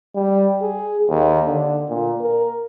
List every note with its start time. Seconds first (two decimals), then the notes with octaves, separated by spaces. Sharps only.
0.15 G3
0.61 G#4
1.10 D#2
1.46 D3
1.89 A#2
2.21 A#4